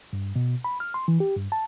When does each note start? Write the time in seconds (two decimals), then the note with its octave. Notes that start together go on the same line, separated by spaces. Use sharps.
0.13 G2
0.36 B2
0.64 B5
0.80 F6
0.94 C6
1.08 E3
1.20 G4
1.36 G2
1.52 A5